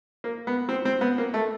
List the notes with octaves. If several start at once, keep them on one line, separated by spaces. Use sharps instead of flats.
A#3
B3
C4
C4
B3
A#3
A3